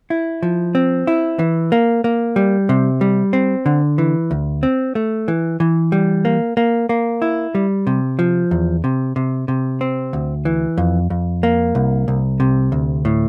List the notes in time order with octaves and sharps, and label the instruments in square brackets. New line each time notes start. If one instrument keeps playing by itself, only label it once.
[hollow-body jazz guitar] E4
F3
C4
E4
E3
A#3
A#3
G3
C3
G3
C4
D3
E3
D2
C4
A3
E3
E3
G3
A#3
A#3
A#3
E4
G3
C3
F3
E2
C3
C3
C3
C4
D2
E3
F2
F2
A#3
C2
C2
C3
D2
A2